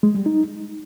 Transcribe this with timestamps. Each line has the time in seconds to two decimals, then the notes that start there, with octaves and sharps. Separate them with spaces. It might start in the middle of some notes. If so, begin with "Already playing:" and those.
0.03 G#3
0.15 G3
0.26 D#4